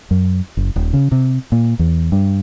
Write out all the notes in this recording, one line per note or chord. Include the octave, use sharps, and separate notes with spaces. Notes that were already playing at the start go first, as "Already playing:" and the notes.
F#2
F#1
D#1
C#3
C3
A#2
E2
G2